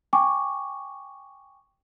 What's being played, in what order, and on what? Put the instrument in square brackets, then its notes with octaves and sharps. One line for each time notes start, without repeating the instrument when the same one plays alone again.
[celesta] G5 G#5 C#6 D6